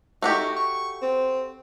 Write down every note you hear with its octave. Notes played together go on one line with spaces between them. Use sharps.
A3 D#4 F#4 G4
C#6
C4